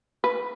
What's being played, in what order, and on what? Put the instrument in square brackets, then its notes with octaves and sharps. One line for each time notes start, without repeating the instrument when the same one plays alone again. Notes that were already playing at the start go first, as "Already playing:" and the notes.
[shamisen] B4